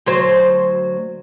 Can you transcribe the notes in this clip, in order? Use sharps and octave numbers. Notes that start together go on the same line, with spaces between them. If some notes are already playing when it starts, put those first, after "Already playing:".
D2 F#3 C5